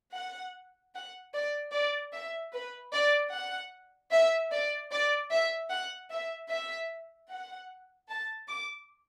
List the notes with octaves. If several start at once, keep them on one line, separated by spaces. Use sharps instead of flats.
F#5
F#5
D5
D5
E5
B4
D5
F#5
E5
D5
D5
E5
F#5
E5
E5
F#5
A5
D6